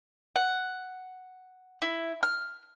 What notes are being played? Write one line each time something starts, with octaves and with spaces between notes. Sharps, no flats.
F#5
E4
F6